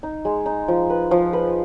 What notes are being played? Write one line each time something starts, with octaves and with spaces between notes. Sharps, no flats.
D#4
G#3
D#4
F3
B4
F3
B4